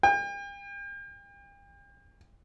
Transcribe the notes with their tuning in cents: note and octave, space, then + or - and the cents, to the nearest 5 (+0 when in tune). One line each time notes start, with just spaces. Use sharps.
G5 +40